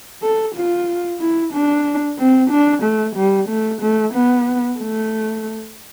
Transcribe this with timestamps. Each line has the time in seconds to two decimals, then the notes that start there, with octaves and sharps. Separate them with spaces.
0.23 A4
0.56 F4
1.20 E4
1.53 D4
2.19 C4
2.51 D4
2.83 A3
3.16 G3
3.49 A3
3.82 A3
4.14 B3
4.80 A3